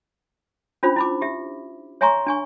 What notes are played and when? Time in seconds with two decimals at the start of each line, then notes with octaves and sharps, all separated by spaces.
0.83 C#4 D4 F4 C5 B5
0.96 E4 B5 D6
1.21 G4 E5
2.01 C#5 E5 G#5 A#5 C6 C#6
2.27 D4 G#5 C#6